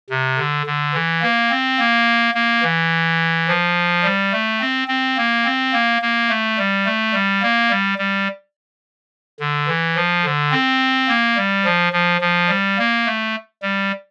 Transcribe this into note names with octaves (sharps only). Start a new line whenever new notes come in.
C3
D3
D3
E3
A#3
C4
A#3
A#3
E3
F3
G3
A3
C4
C4
A#3
C4
A#3
A#3
A3
G3
A3
G3
A#3
G3
G3
D3
E3
F3
D3
C4
A#3
G3
F3
F3
F3
G3
A#3
A3
G3